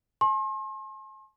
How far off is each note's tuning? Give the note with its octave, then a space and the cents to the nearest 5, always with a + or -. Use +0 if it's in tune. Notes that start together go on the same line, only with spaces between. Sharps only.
A5 -45 C6 +40